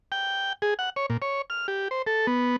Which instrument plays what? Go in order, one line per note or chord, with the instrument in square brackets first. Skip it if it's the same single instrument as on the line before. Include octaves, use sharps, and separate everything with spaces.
[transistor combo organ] G5
G#4
F#5
C#5
A#2
C#5
F6
G4
C5
A4
B3